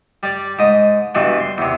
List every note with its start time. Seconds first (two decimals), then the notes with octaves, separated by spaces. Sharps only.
0.23 G3 D5
0.59 G#2 D#5
1.15 G2 B2 E3
1.40 C6
1.58 E2 C3